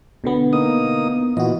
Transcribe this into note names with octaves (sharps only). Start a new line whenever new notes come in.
B2 D3 B3
A#3 D#4 D#6
A#2 E3 F#4 D#5